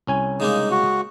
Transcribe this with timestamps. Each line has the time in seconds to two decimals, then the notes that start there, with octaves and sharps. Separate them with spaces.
0.07 C2 C#4 G#5
0.40 C#3 G#3 A#3 D#4
0.71 F#4